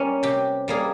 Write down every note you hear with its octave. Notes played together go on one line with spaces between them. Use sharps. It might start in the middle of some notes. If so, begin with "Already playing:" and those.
Already playing: G3 A#3 C#4
C3 G4
G3 A#3 G#4